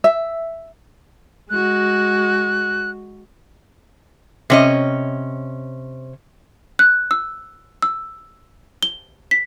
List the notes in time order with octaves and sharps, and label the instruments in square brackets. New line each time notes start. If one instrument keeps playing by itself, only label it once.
[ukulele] E5
[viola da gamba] G#3 F#4 [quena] F#6
[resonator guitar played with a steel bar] C3 C#4 D#5
[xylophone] F#6
E6
E6
G7
B6